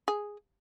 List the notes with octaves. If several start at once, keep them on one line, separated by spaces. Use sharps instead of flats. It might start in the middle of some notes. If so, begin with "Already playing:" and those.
G#4